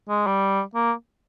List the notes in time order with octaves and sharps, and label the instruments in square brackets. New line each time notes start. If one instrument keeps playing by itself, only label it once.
[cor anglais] G#3
G3
A#3